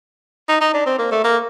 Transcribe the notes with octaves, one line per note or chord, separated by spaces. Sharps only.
D#4
D#4
D4
C4
A#3
A3
A#3